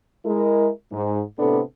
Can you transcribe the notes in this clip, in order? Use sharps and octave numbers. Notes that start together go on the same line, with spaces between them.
G#3 E4 A#4
G#2
A2 C3 B3 D4 A4